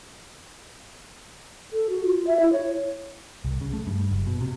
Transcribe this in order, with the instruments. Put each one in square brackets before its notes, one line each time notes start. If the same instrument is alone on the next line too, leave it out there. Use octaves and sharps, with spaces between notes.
[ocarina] A4
F#4
F4
E5
E4
C#5
[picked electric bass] C2
C#3
A3
G2
F#1
B2
C3